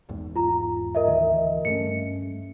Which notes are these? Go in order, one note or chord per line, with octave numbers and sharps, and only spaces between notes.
G#1 E2 G#2
F4 A#5
A#4 D#5 E5
D2 D#3 E3
G2 A3 C#4 C#7